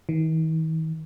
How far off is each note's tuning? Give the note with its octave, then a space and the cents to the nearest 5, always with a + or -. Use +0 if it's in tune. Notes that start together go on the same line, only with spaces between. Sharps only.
D#3 +45